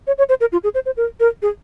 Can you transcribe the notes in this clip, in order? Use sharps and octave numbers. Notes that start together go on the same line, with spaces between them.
C#5
C#5
C5
A#4
F4
G#4
C5
C5
A#4
A#4
G#4